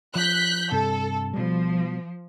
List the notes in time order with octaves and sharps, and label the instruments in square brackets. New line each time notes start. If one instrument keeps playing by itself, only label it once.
[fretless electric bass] F3 [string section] F#6 G6 B6
[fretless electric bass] G2 C3 [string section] A4
[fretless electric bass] B2 G3 [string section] F3